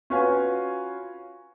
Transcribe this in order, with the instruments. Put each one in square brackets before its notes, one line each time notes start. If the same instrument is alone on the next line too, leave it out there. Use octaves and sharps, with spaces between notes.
[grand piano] C#4 F4 F#4 B4 F5 G#5